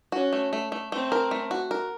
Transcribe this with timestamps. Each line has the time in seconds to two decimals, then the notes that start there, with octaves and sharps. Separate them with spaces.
0.12 C#4 F#4
0.33 A3
0.53 A3
0.72 A3
0.92 A3 C4
1.12 A#4
1.31 A3
1.51 F#4
1.71 A#4